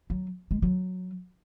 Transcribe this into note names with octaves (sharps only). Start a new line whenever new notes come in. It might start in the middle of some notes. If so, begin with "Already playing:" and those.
F#3
G#3
F#3